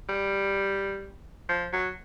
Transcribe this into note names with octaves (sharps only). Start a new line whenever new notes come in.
G3
F3
F#3